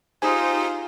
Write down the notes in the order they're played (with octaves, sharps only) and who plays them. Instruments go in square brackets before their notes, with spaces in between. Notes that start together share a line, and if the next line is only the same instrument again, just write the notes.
[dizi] D#4 [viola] F4 [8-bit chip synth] G4 G#4 C5 [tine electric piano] G#5